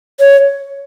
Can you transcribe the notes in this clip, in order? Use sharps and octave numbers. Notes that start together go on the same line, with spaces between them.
C#5